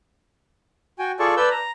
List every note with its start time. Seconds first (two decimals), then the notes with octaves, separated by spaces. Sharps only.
0.99 F#4 G5 G#5
1.19 F4 G#4 A4 D5 A5 C#6
1.37 B4 D5 A5 E6 G6
1.51 A#5